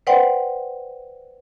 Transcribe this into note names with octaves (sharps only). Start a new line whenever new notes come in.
B4 C5 D5 F#5 G5 C6